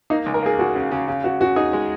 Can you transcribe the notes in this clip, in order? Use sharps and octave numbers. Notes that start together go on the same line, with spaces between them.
A#3 D#4
C#2
A#4
A#3 G#4
C#2 F#4
C#3
C#3
C#3
C#3 F#4
C#3 F#4
D#4 G#4
G#3